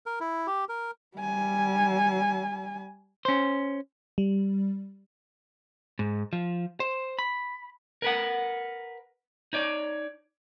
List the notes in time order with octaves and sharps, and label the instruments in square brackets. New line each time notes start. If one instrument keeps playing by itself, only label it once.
[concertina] A#4
E4
G4
A#4
[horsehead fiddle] G3 G#5
[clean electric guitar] C#4 C5
[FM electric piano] G3
[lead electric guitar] G#2
F3
C5
B5
[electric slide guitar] A#4 B4 F#5
D#4 C#5 D5